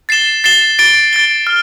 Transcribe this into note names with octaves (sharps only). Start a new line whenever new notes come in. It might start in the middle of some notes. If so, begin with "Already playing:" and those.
A6 C7 E7 G7
A6 C7 E7 G7
A6 D7 G7
A6 D7 G7
F6